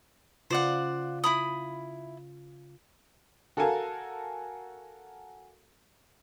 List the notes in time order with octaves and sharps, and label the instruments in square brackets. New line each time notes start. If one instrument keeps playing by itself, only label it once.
[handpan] C#3 F4 [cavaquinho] C5 D5 F#5
[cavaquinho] E4 B5 D#6
[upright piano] F#4 A4 A#4 F5 G#5 A5